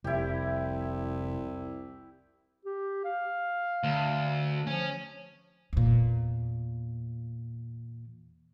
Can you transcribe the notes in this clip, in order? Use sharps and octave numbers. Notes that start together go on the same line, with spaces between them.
F1 C2 E4 G4
G4
F5
D2
F3 C#4
E2 A#2